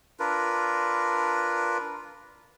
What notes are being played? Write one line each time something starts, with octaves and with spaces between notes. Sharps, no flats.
D4 F4 A#4 B4